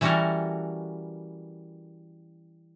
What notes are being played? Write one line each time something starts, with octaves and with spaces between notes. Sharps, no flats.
E3 G3 C#4 F#4 A4 A#4